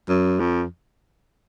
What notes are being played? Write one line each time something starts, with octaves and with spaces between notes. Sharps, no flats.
F#2
F2